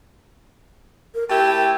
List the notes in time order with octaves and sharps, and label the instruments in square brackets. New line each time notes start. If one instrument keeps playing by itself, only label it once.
[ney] A#4
[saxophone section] A3 E4 G4 [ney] G5